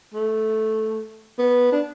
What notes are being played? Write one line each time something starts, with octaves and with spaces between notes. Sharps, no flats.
A3
B3
D4